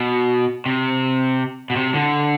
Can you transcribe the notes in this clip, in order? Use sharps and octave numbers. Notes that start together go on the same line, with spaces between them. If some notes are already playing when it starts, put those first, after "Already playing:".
Already playing: B2
C3
B2
C3
D3